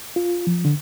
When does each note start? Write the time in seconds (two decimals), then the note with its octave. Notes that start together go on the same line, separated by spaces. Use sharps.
0.16 F4
0.47 F3
0.65 D3